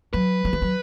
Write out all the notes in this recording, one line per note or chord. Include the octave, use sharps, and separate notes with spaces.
F#3 B4
F#3
E3
F#3